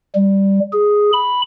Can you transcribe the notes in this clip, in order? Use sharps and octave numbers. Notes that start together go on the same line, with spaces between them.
G3
G#4
B5